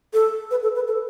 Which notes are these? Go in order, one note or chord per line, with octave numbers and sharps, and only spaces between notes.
A4
B4
A4
B4
A4